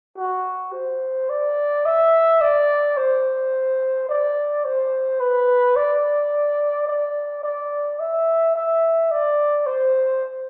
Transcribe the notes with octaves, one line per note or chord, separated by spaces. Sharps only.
F#4
C5
D5
E5
D5
C5
D5
C5
B4
D5
D5
D5
E5
E5
D5
C5